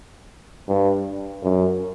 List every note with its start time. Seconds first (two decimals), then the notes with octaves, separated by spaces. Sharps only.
0.68 G2
1.43 F#2